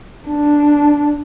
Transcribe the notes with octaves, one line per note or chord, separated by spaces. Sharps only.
D4